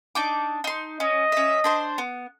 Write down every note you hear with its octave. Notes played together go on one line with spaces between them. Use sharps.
D4 D#4 D6
D#4 C6
C#4 D#5
C#4 E5
D4 C5 C6
B3